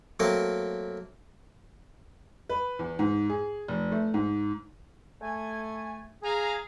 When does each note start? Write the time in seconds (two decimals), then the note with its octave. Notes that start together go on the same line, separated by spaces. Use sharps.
0.20 F#3 A3 A#3 C4 A#4
2.49 B4
2.79 E2
2.99 G#2
3.30 G#4
3.68 F1
3.92 A3
4.14 G#2
5.22 A3 G#5
6.23 G#4 F5 G#5 A#5